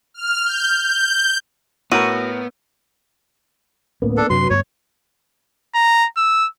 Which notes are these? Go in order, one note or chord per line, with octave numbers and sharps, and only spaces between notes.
F6
G6
G6
A2 B3 F#4 A#4 D#7
D1 A2 A#3 B3 C#4
D4 A4
F#2 C3 F#3 D4 B4 C6
D2 G2 B3 C#5
A#5
E6